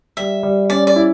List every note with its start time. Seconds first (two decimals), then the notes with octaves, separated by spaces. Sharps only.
0.17 G3 E5
0.43 G3
0.70 C#4 D5
0.87 D5
0.96 E4